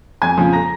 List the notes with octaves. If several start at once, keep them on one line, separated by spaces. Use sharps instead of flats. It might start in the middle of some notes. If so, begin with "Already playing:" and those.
F2 G#5 G#6
C#3 F3
A#5 A#6